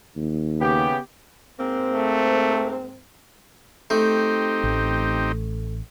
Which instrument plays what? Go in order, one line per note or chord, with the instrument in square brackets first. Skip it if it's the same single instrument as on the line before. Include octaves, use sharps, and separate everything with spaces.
[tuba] D#2
[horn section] C#3 B3 G4
[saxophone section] G#2 A#3 C4
[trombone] A3
[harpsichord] A3 [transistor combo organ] C4 D#4 G4
[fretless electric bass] A1